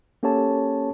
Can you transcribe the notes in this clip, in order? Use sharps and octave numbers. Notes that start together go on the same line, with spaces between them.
A#3 C#4 G4 A4 C#5 A5